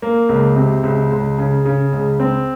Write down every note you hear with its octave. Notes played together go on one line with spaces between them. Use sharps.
A#3
C#2
C3
C#2
C#2
C#3
C#3
C#2
C4